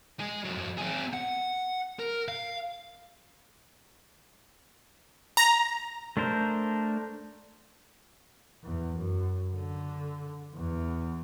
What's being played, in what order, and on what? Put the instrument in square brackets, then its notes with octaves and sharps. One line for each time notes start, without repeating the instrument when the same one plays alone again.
[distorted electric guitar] G#3 G#4
F2 F#3
C4 G#4
F#5
A#4
F5
[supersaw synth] A#5
[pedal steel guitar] A3 D4 A#4 C5
[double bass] E2
F#2
D3
E2